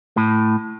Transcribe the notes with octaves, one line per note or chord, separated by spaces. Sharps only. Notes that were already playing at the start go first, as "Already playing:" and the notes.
A2